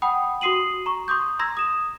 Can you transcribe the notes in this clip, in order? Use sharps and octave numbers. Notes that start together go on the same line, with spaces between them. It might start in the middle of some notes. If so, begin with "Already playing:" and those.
F#5 G5 B5 D#6
F#4 C6 D#6 C7 D#7 F#7
A#5 C#6
C6 D6 D#6 G6
A#5 C6 E6 G#6 A#6
D#6 E7